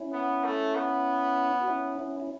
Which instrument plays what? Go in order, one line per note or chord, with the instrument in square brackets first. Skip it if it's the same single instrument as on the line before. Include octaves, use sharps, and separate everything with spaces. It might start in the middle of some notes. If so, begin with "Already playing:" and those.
Already playing: [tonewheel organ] C#4 E4
[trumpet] B3
A3
B3
[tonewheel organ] F#4
C#4 E4
C#4 E4
E4